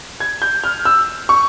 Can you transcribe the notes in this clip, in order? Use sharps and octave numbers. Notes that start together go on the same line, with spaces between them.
G#6
G6
F6
E6
C#6